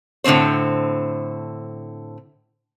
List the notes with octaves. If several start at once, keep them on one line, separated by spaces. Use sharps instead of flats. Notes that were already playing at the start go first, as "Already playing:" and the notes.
A2 D3 G#3 C4 C5